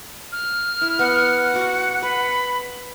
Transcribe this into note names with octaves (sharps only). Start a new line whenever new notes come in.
F6
E4
B3 F#5
F#4 D6
B4 B5